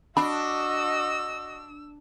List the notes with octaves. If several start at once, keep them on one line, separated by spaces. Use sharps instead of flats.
D4 F#4 D#5 B5 E6